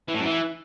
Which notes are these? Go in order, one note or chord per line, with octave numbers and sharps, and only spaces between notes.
E3
A2
F#2
E3